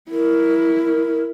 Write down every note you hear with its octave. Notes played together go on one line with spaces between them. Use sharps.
E4 A#4